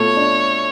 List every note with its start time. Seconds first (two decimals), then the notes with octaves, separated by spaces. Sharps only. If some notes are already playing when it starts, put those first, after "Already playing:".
Already playing: B2 A3 F4 C#5
0.16 D4